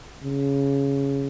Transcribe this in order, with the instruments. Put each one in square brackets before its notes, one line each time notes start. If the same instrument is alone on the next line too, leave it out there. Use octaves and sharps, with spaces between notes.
[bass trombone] C#3